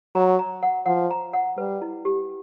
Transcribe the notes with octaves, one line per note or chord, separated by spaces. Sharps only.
F#3 A#5
A#5
F#5
F3 F#5
A#5
F#5
G3 B4
E4
G4